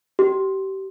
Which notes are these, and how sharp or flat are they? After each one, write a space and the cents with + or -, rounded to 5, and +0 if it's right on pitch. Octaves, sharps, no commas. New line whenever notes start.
G4 -30